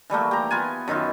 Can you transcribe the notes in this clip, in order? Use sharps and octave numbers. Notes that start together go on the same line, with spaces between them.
E3 G3 A3 A#3
G4 A#5
B3 F4 G#5
F#2 D#3 E4 F4